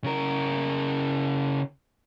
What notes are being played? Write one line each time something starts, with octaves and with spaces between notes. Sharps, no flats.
C#3 A#4